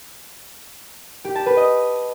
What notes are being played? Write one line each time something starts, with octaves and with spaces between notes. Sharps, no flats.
G4
A5
B4
D#5